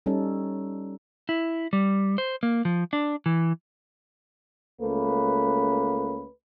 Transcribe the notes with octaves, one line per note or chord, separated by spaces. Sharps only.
G3 C#4 D#4 A4
E4
G3
C5
A#3
F3
D4
E3
C#2 A3 A#3 C#4 B4